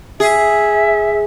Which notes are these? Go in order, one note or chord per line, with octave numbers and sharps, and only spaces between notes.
G#4 E5